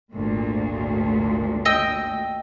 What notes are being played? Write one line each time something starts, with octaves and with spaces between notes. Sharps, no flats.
G#1 D2 A#2
D#5 G5 E6